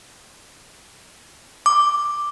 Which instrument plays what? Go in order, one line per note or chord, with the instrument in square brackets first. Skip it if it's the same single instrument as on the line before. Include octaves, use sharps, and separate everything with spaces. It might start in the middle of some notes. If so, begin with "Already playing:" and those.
[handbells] D6